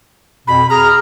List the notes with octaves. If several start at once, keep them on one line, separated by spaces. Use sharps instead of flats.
F2 B2 B5
G#4 A#5 F6